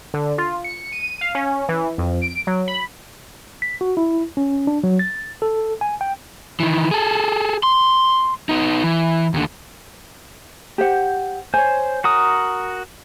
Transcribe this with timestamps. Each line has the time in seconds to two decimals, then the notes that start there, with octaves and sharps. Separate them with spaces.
0.14 D3
0.38 F4
0.64 C#7
0.92 D#7
1.21 F5
1.35 C#4
1.69 E3
1.98 F2
2.22 D7
2.47 F#3
2.68 B5
3.62 B6
3.81 F#4
3.97 E4
4.37 C#4
4.67 D4
4.84 F#3
4.99 A6
5.42 A4
5.81 G#5
6.01 G5
6.60 D#3 E3
6.91 G#4 A4
7.63 C6
8.49 B3 D#4
8.84 E3
9.34 D#2 D3
10.78 G4 C5 F#5
11.54 C5 C#5 G#5
12.04 F#4 A#4 D#6